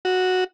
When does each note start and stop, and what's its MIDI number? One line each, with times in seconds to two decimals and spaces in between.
0.05 0.44 66